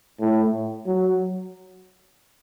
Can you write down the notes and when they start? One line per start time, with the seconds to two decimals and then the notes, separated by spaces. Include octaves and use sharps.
0.20 A2
0.86 F#3